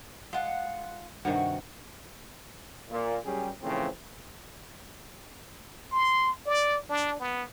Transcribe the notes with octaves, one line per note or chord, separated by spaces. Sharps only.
G#3 F4 F#5
G2 C3 D#3 F#4
A#2
F#2 C#3 G3 C#4 G4 G#4
A2 C#3 E3 F3 C4
C6
D5
D4
B3